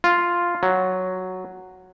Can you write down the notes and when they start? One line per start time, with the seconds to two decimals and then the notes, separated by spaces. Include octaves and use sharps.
0.04 F4
0.63 F#3